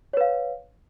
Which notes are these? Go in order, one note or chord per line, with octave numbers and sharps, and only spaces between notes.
B4 C#5 F5